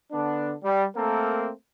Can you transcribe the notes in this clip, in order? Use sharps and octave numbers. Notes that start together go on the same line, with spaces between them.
D3 B3 D4
G3
A3 A#3 C4 A4 A#4